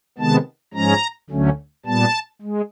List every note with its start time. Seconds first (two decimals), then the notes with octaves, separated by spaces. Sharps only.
0.18 C3 D#3 G#3 B3 A5
0.74 G#2 F3 G#3 C#4 A#5
1.30 D2 D3 F#3 A3 C#4
1.86 A#2 G3 B3 A5
2.42 G#3